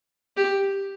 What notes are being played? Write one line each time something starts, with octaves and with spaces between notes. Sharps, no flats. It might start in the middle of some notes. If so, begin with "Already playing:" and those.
G4